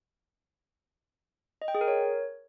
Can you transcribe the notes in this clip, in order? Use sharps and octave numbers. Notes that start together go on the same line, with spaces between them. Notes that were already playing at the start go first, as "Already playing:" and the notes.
D#5
G5
G#4
A#4
C#5